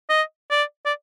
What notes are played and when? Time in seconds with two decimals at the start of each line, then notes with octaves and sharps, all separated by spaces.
0.09 D#5
0.50 D5
0.86 D5